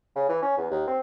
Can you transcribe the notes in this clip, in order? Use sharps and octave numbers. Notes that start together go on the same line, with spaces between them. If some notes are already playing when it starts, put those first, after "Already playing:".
C#3
E3
C#4
E2
D#2
C4